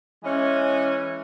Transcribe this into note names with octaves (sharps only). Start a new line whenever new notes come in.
E3 G#3 C#4